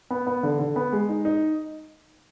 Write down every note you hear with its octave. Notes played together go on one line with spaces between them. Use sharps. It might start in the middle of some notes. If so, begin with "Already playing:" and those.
B3
B3
D3
D3
B3
G#3
D#4
D#4